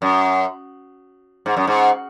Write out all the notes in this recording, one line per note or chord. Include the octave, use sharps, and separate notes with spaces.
F#2
G#2
F#2
G#2